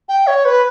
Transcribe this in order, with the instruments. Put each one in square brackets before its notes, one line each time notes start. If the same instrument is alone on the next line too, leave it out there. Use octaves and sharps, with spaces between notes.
[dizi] G5
C#5
B4